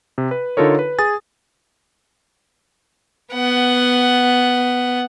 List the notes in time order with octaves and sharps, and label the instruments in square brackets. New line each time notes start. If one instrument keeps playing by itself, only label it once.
[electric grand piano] C3
B4
D3 D#4 F4 A4 A#4 C#5
B4
G#4 G#5 D#6 A6
[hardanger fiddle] B3 F#5